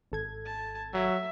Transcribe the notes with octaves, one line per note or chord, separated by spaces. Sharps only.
G#1 A4 G#6
A5
F#3 E5